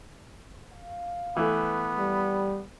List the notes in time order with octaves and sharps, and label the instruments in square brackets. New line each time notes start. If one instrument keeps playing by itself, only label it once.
[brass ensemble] F5
[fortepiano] E3 A3 [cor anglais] B3
[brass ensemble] G3